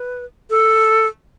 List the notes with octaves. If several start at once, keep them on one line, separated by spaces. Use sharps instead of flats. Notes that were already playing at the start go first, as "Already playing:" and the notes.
Already playing: B4
A4